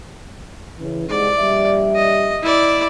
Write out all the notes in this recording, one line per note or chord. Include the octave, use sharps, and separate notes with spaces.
C#3 E3
C2 G#2 D5
A#1 G3 E5
D#5
E4 D5